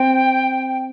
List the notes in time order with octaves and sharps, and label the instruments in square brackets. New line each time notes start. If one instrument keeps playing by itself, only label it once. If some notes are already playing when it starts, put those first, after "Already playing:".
Already playing: [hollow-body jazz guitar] C4 [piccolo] G5